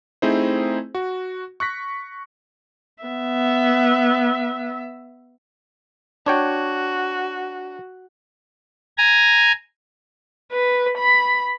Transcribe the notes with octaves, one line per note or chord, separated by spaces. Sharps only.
A3 C4 D#4 E4 G#4 C5
F#4
C#6 F#6 A#6 B6
B3 E5
D4 F#4 C#5 G5
G#5 A#5
B4
B5